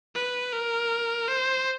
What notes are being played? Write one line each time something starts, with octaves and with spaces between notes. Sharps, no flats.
B4
A#4
C5